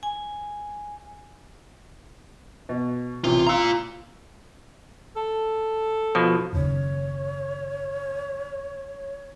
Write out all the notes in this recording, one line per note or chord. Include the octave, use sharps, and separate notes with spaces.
G#5
B2
A1 C3 F4
F4 F5 A#5 C6 E6
A4
B2 F3
F#1 D#2 C#3 C#5